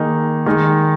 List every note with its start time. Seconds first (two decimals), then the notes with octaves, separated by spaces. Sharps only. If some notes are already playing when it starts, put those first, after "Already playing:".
Already playing: D#3 A#3 D#4 G#4
0.46 D#3 G#3 D#4